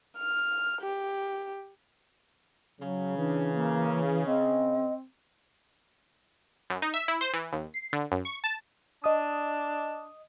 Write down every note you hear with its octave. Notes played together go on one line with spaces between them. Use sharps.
F6
G4
C#3 F#3
E3 D4
A#3
C4 D#5
F#2
D#4
E5
E4
C5
E3
D#2
C7
D3
F#2
C#6
A5
D4 D#5 D#6